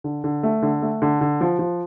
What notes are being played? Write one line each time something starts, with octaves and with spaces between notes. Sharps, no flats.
D3
D3
A3
D3
A3
D3
D3
F3
F3